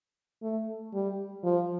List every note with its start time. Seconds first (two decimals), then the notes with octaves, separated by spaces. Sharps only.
0.43 A3
0.93 G3
1.44 F3